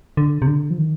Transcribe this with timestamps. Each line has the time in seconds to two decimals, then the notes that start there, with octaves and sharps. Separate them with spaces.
0.17 D3
0.42 C3
0.47 D3
0.71 F3
0.79 D#3